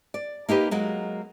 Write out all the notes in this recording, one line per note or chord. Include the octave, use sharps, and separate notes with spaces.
D5
A#3 D#4 G4 B4
F#3 G#3 A#3